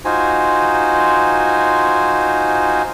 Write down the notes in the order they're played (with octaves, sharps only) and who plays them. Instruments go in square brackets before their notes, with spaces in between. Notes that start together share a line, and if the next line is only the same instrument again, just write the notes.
[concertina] D#4 F4 F#4 C5 G#5